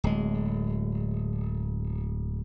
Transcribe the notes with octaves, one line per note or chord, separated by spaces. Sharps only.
D1 G#3